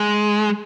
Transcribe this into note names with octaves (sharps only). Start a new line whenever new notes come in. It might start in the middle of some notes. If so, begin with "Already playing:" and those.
Already playing: G#3